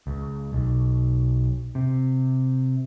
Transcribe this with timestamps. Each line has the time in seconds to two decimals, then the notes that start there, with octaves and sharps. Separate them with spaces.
0.07 C#2
0.53 B1
1.75 C3